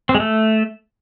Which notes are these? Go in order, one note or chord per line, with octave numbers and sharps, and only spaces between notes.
C4
G#3
A3